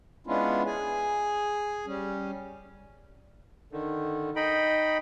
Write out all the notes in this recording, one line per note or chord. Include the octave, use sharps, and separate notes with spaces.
G#3 B3 C#4 D4 E4 F4
G#4 G#5
G3 C#4
D3 D#3
D#4 D#5 G5 B5